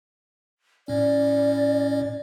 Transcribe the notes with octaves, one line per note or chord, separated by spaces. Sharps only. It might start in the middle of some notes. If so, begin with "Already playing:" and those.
A2 C#4 D5